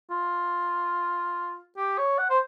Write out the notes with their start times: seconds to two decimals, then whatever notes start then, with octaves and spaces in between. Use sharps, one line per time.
0.10 F4
1.77 G4
1.98 C#5
2.18 F#5
2.30 C5